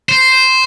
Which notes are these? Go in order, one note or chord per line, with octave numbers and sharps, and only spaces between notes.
C5